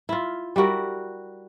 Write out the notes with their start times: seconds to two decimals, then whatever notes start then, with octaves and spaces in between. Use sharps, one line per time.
0.09 E4 F4
0.56 G3 E4 F#4 A#4